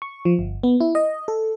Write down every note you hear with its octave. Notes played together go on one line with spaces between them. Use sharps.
C#6
F3
G1
B3
E4
D#5
A4